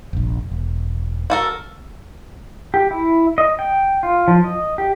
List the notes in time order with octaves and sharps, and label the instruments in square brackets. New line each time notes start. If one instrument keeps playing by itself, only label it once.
[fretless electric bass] F1 A#1
E1
[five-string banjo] F#4 A4 A#4
[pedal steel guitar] G4
E4
D#5
G5
F4
F3
D#5
G4